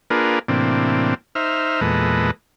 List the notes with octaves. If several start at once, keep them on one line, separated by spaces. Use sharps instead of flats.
A#3 D4 F4 G#4 A#4 B4
A2 C3 E3 A#3 C4 D4
D#4 C5 E5 F6
E2 A#2 G#3 A4 B4 D#5